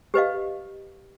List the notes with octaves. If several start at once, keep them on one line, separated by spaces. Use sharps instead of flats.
G4 B4 D#5 F5